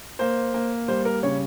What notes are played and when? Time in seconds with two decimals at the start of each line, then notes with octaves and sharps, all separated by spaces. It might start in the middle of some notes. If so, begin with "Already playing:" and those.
0.19 A#3 C5
0.54 A#3
0.88 G3 C5
1.05 A#4
1.23 C#3 C#5